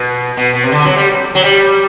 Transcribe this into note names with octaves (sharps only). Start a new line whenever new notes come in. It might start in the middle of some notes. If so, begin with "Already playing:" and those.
Already playing: B2
B2
B2
C3
D3
F#3
G3
F#3
G3